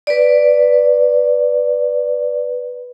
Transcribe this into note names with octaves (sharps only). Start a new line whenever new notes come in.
B4 D5